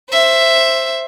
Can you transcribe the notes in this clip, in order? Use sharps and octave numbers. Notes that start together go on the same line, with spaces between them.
C5 E5